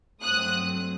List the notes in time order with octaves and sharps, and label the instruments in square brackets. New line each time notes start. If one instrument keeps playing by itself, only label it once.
[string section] G2 F#3 A3 C4 D#6 F#6